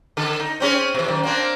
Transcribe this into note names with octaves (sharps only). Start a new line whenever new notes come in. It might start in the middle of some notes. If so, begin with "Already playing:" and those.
D3 A4
D#4
C4 C#4 G#4
B2 E3
F#2 D#3
A#3 C4 D4